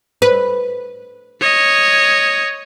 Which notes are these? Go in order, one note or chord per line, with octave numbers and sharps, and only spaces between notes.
B4
C#5 D#5